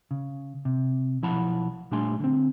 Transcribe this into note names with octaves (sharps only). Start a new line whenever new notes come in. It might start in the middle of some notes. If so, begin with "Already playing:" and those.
C#3
C3
B1 F3 E4 F#5 A5 B5
A#2 G3 A3 D4 G#5 C6
D3 C4